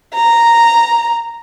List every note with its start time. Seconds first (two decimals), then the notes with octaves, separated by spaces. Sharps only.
0.14 A#5